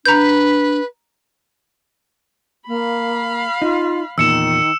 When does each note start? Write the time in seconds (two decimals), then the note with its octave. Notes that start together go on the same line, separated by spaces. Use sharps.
0.06 D4 B4 A#5 G6
2.68 A#3 F5 B5
3.62 D#4 F4
4.18 E2 A#2 D#3 E6 C#7 E7